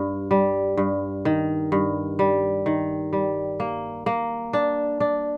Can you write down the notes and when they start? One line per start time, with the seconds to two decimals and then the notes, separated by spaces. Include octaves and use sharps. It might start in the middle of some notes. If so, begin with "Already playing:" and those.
Already playing: G2
0.31 G3
0.77 G2
1.25 D#3
1.72 G2
2.19 G3
2.66 D#3
3.13 G3
3.60 A#3
4.06 A#3
4.53 D4
5.00 D4